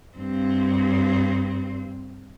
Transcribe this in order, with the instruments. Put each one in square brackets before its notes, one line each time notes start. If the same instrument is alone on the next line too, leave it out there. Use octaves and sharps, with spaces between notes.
[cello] G2 C4